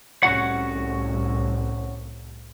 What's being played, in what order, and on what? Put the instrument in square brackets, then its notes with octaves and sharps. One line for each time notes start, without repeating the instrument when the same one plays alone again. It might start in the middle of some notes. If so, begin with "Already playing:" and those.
[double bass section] C2 A2 [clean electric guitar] C#4 F#4 F#5